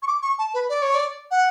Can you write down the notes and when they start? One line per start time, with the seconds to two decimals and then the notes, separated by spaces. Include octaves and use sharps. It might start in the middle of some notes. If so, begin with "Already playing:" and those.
0.02 C#6
0.07 D6
0.22 C#6
0.38 A5
0.54 B4
0.69 D5
0.82 C#5
0.95 D5
1.31 F#5